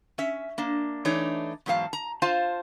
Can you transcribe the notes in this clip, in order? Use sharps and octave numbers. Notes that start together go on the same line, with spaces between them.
C#4 E5
A#3 D4
E3 A3 D4 D#4 C#5
E2 G#2 F#3 A#3 F5 A5
A#5
F4 C5 F5 A5